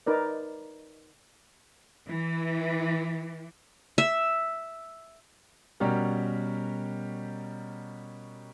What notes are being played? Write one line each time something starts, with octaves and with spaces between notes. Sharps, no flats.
D#4 A#4 B4 D5
E3
E5
B2 G3 C#4 F#4 G4 A#4